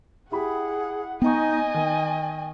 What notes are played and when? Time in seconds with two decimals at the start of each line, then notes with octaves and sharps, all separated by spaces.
0.32 E4 G4 G#4 F#5 B5
1.22 B3 D#4 D#5 G5 G#5 C#6
1.74 D#3 G5